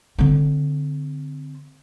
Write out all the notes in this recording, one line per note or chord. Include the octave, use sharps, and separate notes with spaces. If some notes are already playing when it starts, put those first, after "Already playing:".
D3 C4